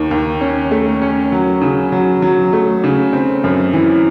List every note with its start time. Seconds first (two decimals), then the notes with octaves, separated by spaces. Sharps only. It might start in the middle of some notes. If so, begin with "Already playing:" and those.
Already playing: D#2 D#3
0.11 D#2
0.41 C#4
0.71 A3
1.02 C#4
1.32 F#3
1.61 C#3
1.92 F#3
2.22 F#3
2.53 A3
2.84 C#3
3.13 C4
3.44 F#2
3.73 E3